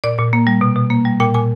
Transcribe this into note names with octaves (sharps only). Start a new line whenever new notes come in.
A#2 D5
A#2
A#3
G3
B2
B2
A#3
G3
A#2 G5
A#2 G#5